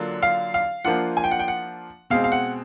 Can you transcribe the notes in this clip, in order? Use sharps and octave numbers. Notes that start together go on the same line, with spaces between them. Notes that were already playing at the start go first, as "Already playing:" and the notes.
Already playing: D3 F#3 A#3 D4 F4
F5
F5
F3 A#3 D4 F4 F#5
G#5
G5
F#5
G5
F#5
B2 G#3 C4 F5
F5
F#5